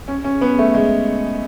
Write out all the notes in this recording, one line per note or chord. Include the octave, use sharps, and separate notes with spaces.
C#4
C#4
B3
A3
G#3